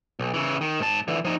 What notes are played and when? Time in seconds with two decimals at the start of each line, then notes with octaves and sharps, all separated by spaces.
0.19 B1
0.34 C#3 E3
0.61 D#3
0.79 G#2 A5
1.08 D3 E3
1.25 F3 D#4